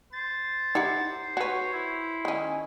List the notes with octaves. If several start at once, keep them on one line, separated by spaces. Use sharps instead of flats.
C5 A6
D#4 E4 G4 F#5
F#4 B4 C#5
E4
D#3 C#4